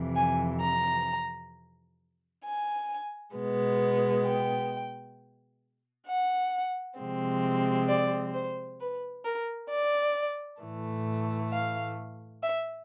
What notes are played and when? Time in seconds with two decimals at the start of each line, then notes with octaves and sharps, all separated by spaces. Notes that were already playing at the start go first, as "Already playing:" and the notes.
Already playing: F2 C3 E3
0.16 G#5
0.61 A#5
2.44 G#5
3.34 B2 G#3 B3
4.25 G5
6.07 F#5
6.98 C3 F3 G#3 C4
7.88 D5
8.34 C5
8.80 B4
9.25 A#4
9.70 D5
10.61 A2 E3 A3
11.52 F5
12.43 E5